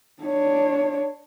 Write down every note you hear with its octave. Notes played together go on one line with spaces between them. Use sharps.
D4 C#5